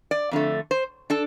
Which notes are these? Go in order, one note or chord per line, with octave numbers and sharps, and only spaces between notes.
D5
F2 D3 A3
C5
D4 A4